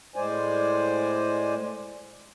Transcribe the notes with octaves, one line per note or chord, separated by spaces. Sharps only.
A2 G#3 C5 D5 G#5